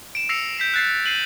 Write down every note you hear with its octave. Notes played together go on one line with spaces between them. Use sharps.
D7 E7
E6 A#6 C7 C#7 F7
G6 B6 C7 D7
F#6 A6 C7
C7 D#7 F#7